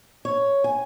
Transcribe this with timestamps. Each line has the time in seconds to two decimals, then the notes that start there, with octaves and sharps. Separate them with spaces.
0.25 C#5
0.64 G#5